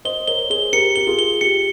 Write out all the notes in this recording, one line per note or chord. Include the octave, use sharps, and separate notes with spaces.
C5 D#5 G7
A#4 C#5 G7
G#4 C5 G7
G4 A#4 C#7
G4 G7
F4 G#4
G7
G4 C#7